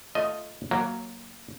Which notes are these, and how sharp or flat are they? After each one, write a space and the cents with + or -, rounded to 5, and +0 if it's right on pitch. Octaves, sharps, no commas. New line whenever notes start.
A3 +0 F4 -5 D#5 +5
F#3 +0 A#3 -5